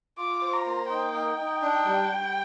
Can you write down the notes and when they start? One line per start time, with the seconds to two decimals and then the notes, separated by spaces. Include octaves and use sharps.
0.17 F4 D6
0.41 C5
0.53 A#5
0.66 A#3
0.89 D#4 G5
1.13 D#4
1.38 D#4
1.62 D4
1.85 G3
2.09 G3